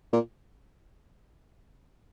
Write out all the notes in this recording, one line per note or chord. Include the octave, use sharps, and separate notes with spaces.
A#2